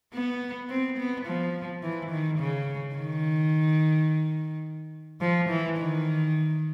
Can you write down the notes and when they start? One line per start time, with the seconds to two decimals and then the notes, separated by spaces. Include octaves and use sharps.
0.13 B3
0.70 C4
0.98 B3
1.26 F3
1.83 E3
2.11 D#3
2.39 C#3
2.95 D#3
5.21 F3
5.49 E3
5.77 D#3